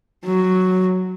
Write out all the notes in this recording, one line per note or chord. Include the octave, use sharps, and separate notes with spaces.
F#3